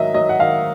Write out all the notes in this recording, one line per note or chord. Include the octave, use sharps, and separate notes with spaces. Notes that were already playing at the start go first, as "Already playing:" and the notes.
Already playing: G#2 D#3 F#3 D#5 E5
F#3 D#5
F#5
D#3 F5